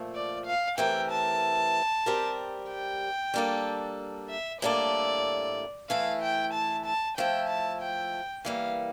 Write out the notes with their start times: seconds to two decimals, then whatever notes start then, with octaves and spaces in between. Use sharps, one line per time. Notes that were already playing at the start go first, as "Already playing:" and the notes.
Already playing: A#2 F3 A3
0.15 D5
0.46 F5
0.78 E3 A3 C4 G4 A#4 G5
1.11 A5
2.06 G3 C4 G4 A#4
2.70 G5
3.34 G3 A#3 D4 A4
4.29 E5
4.61 A2 G3 A#3 D4 A4 D5
5.89 E3 A3 E4 F5
6.22 G5
6.54 A5
6.86 A5
7.17 F3 A3 E4 G5
7.49 A5
7.82 G5
8.45 E3 G3 A#3 F5